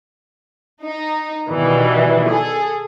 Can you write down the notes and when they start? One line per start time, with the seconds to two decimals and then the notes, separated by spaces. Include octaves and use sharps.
0.84 D#4
1.50 B2 D#3 E3 G3
2.26 G#4 A4